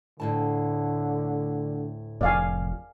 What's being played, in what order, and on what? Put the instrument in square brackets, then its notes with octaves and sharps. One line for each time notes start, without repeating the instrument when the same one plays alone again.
[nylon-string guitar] D2 A2 A5 [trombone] D3
[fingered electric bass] F1 [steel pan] D5 F5 G#5